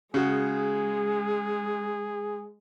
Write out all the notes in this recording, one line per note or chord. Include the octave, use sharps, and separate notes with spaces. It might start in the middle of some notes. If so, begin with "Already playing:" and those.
C#3 G#3 F#4 G#4